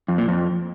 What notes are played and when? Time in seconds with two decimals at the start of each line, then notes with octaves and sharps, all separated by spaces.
0.08 F2
0.18 A#2
0.28 F2